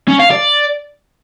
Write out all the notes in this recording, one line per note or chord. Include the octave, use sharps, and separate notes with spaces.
C#4
F5
D5